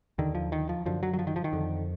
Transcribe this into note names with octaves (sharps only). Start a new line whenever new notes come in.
D#2 D3 D#3
F3
D#3
F3
F#2 D3 F3
F#3
F#3
F3
D#3
F3
D#3
F2 D3